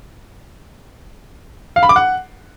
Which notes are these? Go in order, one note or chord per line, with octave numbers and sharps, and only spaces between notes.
F5
B5
D6
F#5